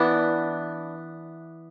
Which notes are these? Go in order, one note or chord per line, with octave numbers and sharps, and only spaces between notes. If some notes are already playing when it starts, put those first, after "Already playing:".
Already playing: E3 B3 D4